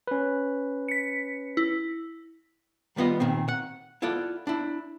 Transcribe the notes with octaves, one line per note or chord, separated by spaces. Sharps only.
C#4 B4
B6 C#7
E4
D#3 G3 B3 F4 D#5
A#2 D#3 C4
F#5
E4 F4 A4 D5 F#5
D4 E4